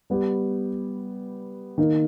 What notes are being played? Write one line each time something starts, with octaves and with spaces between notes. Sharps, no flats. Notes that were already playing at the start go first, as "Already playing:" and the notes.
G3 B3 G4
D#3 A#3 D#4 A#4